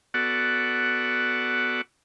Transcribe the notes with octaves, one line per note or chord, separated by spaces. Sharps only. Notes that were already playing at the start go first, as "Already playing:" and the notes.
B3 F#4 A4 D5 F#5